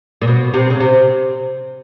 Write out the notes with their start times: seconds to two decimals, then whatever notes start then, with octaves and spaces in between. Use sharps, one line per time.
0.22 A#2
0.27 B2
0.54 C3
0.70 C#3
0.80 C3